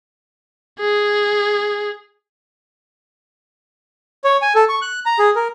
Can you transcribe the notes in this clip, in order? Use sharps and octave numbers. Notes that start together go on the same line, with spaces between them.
G#4
C#5
G#5
A4
C#6
F#6
A#5
G#4
A#4